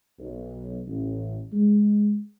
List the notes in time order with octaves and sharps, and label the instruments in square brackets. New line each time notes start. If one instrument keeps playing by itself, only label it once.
[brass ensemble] B1
A1
G#3